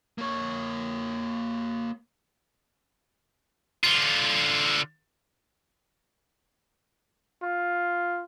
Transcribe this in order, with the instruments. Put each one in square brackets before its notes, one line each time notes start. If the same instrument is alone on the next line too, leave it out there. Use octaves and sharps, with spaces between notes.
[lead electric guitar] A#3 C#5
[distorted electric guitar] D3 F4
[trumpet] F4